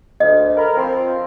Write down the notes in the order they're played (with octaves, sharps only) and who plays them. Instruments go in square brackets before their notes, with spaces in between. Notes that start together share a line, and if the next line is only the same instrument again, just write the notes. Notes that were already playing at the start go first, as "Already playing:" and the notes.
[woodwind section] D2 [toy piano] D#5
[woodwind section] A#4 B5
F3 C4